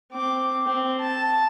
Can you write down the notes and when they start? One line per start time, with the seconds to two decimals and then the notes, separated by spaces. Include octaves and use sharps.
0.12 C4 D6
0.66 C4
1.01 A5